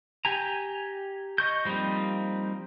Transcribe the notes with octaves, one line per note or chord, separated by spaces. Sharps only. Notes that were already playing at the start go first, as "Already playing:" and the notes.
G4 G#5 A#5
D#5 C#6 G6
F3 G3 A#3 C4 D#4